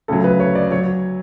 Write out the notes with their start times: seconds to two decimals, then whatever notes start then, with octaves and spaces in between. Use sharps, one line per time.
0.08 D2 C#3 F#3 A4
0.24 B4
0.40 C#5
0.55 D5
0.71 F#3 C#5